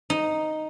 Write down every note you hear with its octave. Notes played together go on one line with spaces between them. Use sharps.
D#4